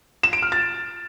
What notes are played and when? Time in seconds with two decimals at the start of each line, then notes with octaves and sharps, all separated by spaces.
0.23 E7
0.33 D7
0.42 F6
0.52 A6